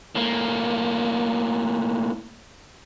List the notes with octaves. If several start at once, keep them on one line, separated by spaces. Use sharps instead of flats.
A2 A#3